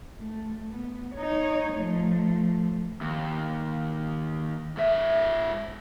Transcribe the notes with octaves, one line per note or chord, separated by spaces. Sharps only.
A3
B3
D#4 C#5
F3 A3
D#2
G#2 E5